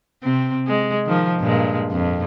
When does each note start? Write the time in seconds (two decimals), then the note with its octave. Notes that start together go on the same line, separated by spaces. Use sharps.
0.23 C3 C4
0.67 G#3
1.06 D#3 F3
1.40 G2 A#2 G#3
1.91 F2